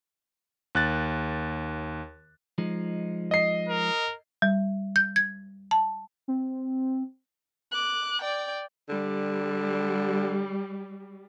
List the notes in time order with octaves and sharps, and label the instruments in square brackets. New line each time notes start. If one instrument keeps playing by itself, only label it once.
[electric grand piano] D#2 F#6 A6
[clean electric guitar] F3 G#3 D#4
[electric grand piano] D#5 C7
[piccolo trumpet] A#4
[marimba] G3
G6
G#6
A5
[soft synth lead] C4
[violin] D6 F#6
D5 G5
[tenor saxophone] D3 [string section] G3